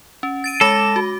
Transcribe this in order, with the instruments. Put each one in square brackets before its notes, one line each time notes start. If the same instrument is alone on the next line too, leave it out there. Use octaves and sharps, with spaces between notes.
[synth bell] C#4
A6 D7 D#7
[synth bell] G#3 D6 A#6 [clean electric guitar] A4
[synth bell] F#4